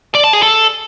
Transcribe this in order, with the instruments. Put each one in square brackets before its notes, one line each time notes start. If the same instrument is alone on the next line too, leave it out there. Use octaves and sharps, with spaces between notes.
[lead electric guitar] D5
A5
G#4
A4